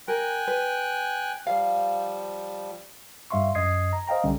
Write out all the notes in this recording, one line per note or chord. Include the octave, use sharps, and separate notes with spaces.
A#4 G5 G#5 F#6
B4
F3 G3 F5
G2 G3 E5 F5 C6 C#6
F#2 D#5 D#6 G#6 C7
A#5
C5 D#5 F5 G5 A#5
B1 D3 G3 C#4